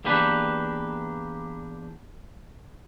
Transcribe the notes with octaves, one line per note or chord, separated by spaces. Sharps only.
E2 A#3 D4 G4 B4